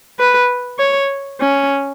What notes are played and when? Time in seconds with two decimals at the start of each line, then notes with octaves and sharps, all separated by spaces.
0.19 B4
0.79 C#5
1.40 C#4